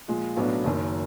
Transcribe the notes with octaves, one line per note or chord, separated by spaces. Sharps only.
A#2 F3 G#3
B1 A2 F#3 B3 D4
F#1 F#2 D#3